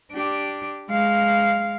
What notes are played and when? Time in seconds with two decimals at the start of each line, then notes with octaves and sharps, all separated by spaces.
0.13 D4 G4
0.90 G#3 F5